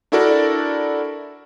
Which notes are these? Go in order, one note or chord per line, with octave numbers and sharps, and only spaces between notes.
D4 E4 F#4 A4 A#4 D5